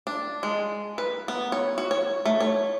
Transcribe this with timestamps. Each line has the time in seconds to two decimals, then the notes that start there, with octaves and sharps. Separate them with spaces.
0.07 D4
0.43 G#3
0.98 B4
1.28 B3
1.52 C#5
1.78 F#4
1.91 C#5
2.25 A3
2.40 C#5